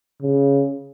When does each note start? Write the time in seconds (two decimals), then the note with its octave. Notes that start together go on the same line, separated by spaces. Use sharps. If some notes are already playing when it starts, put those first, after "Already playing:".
0.22 C#3